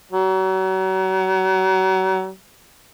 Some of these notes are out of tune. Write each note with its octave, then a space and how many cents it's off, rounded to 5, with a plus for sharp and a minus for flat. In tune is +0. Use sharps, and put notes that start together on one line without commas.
F#3 +35